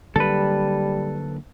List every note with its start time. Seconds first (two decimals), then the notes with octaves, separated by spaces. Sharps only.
0.16 D3 F#3 G3 A#3 A4 B4